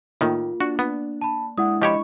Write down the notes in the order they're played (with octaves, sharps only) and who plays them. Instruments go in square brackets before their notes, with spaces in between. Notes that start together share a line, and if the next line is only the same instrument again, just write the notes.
[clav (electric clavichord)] A2 D#3 [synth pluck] A#3 [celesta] F4
[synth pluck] D4 [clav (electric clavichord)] F#4
[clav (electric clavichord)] B3
[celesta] A5 B5
[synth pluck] G#3 D4 E4 [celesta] F#5 D#6
[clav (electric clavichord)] F3 G4 C#5 [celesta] D#5 B5 [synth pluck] C#6